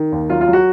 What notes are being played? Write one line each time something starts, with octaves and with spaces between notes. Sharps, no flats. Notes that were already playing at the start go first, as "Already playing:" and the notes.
Already playing: D#3
D#2
F#3 F4
F4
F#3
F#4